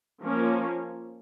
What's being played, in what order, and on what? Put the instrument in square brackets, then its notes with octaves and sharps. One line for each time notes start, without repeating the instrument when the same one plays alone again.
[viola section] F3 A#3 C#4